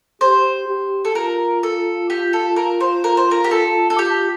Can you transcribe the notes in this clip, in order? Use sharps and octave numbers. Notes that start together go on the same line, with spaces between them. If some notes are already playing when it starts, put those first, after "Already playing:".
G4 C5
G4
A4
F4 A#4
A4
G4
A4
A#4
C5
A#4
C5
A#4
G4
A4
A4
G4